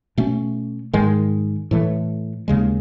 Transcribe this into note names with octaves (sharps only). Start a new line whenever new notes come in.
B2 A3 C#4
G#2 D#3 G#3
A2 E3 A3
D#2 C#3 G#3